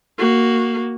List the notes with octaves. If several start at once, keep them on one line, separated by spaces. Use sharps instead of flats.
A#3 F#4